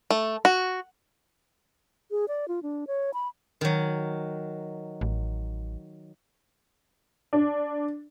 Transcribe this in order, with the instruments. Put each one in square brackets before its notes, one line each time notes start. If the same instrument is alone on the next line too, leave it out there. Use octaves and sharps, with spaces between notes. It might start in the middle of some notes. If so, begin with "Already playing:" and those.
[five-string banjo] A3
F#4
[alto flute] G#4
D5
F4
D4
C#5
B5
[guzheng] D#3 F#3
[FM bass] A1
[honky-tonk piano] D4